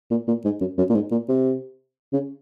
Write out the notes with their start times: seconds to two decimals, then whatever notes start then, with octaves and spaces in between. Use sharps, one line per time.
0.11 A#2
0.27 A#2
0.45 G#2
0.60 F#2
0.78 F#2
0.90 A#2
0.95 G#2
1.11 A#2
1.29 C3
2.13 C#3